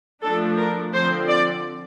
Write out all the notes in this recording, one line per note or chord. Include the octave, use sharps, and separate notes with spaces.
F3 A3 D4 A4
A#4
D3 F3 C4 C5
D5